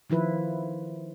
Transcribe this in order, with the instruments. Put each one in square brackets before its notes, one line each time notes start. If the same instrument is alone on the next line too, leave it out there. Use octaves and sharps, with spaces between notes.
[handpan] D#3 F3 E4 B4